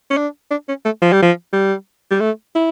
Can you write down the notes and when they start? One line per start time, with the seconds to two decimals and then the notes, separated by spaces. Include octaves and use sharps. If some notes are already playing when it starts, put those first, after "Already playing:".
0.10 C#4
0.17 D4
0.51 D4
0.68 C#4
0.85 A3
1.02 F3
1.12 G3
1.22 F3
1.53 G3
2.10 G3
2.20 A3
2.55 E4